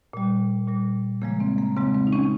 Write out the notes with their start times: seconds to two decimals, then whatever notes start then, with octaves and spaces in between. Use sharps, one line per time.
0.13 A#2 G3
0.68 A#2 G3
1.22 C#3 F3 G#3 A#3
1.40 C4
1.58 A#3
1.76 C#3 G#3 C4
1.95 C4
2.07 D#4
2.13 C#4